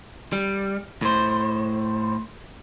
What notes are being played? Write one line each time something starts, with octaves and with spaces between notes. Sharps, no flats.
G3
A2 C5